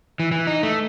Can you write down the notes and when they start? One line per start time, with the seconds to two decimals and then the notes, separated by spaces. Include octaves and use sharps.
0.20 E3
0.32 E3
0.47 D#4
0.63 A3